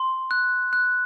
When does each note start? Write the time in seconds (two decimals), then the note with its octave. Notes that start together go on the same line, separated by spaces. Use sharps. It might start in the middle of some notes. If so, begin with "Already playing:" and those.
Already playing: C6
0.31 F#6
0.73 F#6